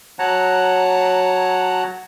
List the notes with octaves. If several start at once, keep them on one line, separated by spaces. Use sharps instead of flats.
F#3 C#5 F#5 A5 A#5 F#6